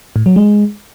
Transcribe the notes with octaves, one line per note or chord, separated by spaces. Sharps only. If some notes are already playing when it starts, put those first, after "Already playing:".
A2
F#3
G#3